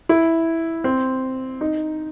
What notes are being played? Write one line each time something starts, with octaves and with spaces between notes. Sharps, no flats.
E4
C4
D#4